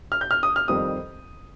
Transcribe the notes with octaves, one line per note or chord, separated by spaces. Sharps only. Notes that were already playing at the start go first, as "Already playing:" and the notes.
F6
G6
F6
D#6
F6
F2 D#3 G3 C4 D#6